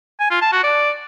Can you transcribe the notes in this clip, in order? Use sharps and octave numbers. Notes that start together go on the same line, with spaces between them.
G#5
F4
A5
F#4
D5